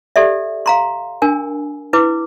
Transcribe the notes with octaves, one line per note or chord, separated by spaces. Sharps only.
G4 A4 D5 E5
F5 A#5 C6
D4 A#4 G#5
E4 B4 D6